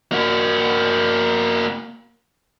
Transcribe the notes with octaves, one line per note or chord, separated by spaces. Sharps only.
A#3 F#4